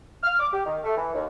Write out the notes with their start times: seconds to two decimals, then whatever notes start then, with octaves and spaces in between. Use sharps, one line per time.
0.23 F6
0.39 D6
0.53 G4
0.66 D#3
0.84 A3
0.97 E3
1.14 D#2